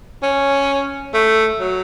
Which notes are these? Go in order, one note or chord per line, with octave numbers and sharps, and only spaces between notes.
C#4
A3
F#3